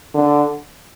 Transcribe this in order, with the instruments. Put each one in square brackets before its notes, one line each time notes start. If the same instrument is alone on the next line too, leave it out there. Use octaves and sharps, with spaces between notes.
[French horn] D3